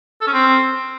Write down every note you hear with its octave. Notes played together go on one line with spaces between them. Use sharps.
A4
C#4
C4